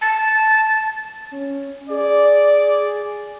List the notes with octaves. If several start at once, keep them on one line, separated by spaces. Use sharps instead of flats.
A5
C#4
G#4 D5